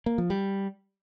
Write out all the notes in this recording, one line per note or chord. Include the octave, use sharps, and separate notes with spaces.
A#3
F3
G3